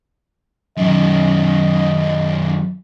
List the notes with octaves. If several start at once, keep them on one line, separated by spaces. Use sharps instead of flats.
F#2 D#3 D#5